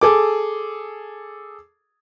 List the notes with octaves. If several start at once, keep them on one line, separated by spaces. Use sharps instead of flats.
G#4 A4 D6